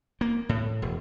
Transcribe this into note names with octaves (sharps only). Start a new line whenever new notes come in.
A#3
A2
E1